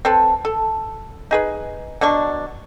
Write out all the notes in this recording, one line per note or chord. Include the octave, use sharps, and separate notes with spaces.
C4 A4 B4
A4
D#4 G#4 B4
B2 F#3 D4 C#6